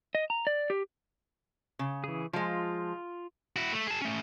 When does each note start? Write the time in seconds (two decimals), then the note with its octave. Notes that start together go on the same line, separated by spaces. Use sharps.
0.15 D#5
0.30 A#5
0.47 D5
0.70 G4
1.79 C#3
2.04 E3 G#4
2.33 F3 G#3 F4
3.56 E4 F#4
3.73 A3
3.87 G#4 A5
4.02 A3 C#4